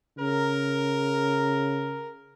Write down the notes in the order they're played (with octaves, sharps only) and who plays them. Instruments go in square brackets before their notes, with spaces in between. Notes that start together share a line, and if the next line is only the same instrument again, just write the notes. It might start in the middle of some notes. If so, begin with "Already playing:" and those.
[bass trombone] C#3 [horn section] A#4